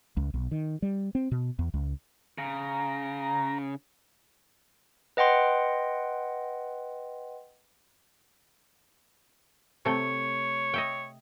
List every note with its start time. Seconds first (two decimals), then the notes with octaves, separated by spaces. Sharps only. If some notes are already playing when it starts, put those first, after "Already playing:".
0.17 C#2
0.34 B1
0.51 D#3
0.82 G3
1.15 C4
1.31 B2
1.59 E2
1.74 C#2
2.38 C#3 A#5
5.17 B4 D#5 F#5 G5 C6
9.85 C3 A3 C#5 G5
10.74 D#5 E5 G5